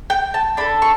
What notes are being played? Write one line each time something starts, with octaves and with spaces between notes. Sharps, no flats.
G5
A5
D4 A4 B5
C#6